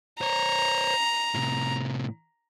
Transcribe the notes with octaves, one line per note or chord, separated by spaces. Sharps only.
C5 C#5 A#5
A2 C3